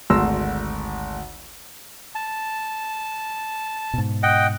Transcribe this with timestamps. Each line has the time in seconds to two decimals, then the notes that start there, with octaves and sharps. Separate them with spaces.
0.10 G#1 D2 C6 E6 A#6
2.15 A5
3.94 G#2 B2
4.23 D#5 F#5 G5